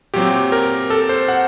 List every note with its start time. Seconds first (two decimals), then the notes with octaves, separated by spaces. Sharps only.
0.14 A#2 F#3 C4 G4
0.52 A#4
0.90 A4
1.09 C5
1.28 F#5